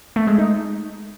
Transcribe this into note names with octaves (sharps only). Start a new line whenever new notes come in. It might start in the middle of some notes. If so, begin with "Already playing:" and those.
A3
G#3
D#4